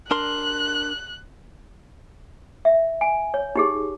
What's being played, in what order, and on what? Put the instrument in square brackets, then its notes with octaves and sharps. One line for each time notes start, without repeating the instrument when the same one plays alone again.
[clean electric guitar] D4 A#4 C6 [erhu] F#6
[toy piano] E5
G#5
C#5
D#4 G4 G#4